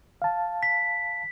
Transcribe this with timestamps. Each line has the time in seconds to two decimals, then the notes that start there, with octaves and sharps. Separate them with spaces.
0.22 F5 A5
0.63 B6